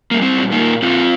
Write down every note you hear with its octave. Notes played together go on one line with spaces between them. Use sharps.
G3 A#3
C4
A#2
A#3 D#4
A#2
A#2 C4 F4